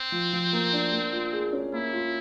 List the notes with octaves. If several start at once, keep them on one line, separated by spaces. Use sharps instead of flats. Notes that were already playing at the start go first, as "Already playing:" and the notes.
Already playing: C4
F3
F3
A#3
D4
A#3
F4
G#4
C#4
A#3 E4
F4